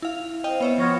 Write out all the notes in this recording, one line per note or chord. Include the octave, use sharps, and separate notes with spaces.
E4 F5
C4 D#5 F5 G5
B3 C#5 E5
F3 B3 F4 C#5 A#6